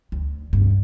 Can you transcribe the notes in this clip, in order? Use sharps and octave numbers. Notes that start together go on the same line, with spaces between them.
D2
G2